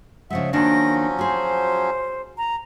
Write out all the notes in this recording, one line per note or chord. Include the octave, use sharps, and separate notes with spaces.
C#3 F3 G#3 E5 F#5
D#3 F3 F#3 A#3 C#4 D4 A#6
F#4 G#4 C5
A#5